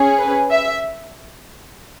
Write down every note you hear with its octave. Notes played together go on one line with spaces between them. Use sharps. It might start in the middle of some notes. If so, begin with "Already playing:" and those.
Already playing: C#4 G#4
B4
E5